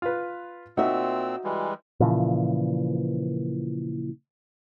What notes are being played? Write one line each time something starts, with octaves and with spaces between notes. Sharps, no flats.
F4 B4
A#2 C4 D#4 F#4 E5 E6
E3 G3 G#3
A#2 C#3 E3 F3